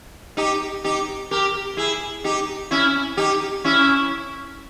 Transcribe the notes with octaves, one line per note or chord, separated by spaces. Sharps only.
D#4 G4
D#4 G4
G4 A#4
E4 G#4
D#4 G4
C#4 E4
D#4 G4
C#4 E4